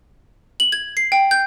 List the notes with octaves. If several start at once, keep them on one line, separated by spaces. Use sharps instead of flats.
F#7
G#6
C7
G5
G6